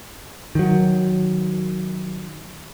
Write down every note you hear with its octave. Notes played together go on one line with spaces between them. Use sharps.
D#3 F#3